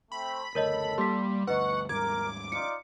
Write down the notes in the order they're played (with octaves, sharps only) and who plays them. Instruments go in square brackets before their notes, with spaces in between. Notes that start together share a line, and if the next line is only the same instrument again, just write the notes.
[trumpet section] A3 C4 [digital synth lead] B5
[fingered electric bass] F#1 D2 [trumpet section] A4 [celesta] A#4 C#5 D#5
[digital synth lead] G3 [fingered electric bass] A#3 [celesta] C6 B6
[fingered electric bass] D2 G2 [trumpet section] D#4 C#6 [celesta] B4 D#5 [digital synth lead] F#5
[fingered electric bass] D#2 G#2 G3 [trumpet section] A#4 [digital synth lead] D6 [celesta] G#6
[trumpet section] D#4 F4 D5 [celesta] C#7